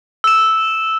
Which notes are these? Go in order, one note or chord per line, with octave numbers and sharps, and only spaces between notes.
E6 E7